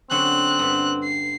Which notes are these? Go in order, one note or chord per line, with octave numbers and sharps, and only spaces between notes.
D3 F#3 C4 C#4 F#6
G2 B3
C7